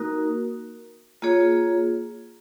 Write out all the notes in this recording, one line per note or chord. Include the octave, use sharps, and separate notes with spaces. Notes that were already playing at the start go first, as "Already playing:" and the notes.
Already playing: A#3 D#4 F#4 A#4
A#3 F4 G#4 C#5